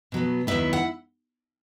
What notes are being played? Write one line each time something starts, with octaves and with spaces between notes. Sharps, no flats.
B2 F#3 B3
D#2 D#3 F#3 B3 E4 E5
F#5